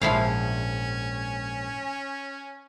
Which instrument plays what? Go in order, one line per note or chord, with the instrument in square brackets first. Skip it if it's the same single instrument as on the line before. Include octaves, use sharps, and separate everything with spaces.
[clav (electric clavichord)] A#1 G#2 [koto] F3 E4 F5 [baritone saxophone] C#4